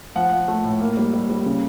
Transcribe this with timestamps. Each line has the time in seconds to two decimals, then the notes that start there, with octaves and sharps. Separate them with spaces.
0.15 F3 F#5
0.32 F3
0.48 A3
0.64 A2
0.81 A#3
0.97 G3
1.13 G3
1.29 G3
1.46 C#3